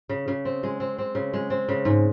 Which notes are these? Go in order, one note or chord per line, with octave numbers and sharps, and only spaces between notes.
C#3
C#3
C4
G#3
C4
C4
C#3
G#3
C4
C#3
G#2